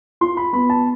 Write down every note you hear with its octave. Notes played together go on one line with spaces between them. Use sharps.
F4 C6
B5
B3 B5
A5